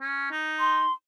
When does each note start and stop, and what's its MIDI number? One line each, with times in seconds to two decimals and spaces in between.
0.01 0.29 61
0.32 0.86 63
0.60 0.92 84